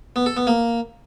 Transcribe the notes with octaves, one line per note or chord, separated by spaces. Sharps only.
B3
A4
B3
A#3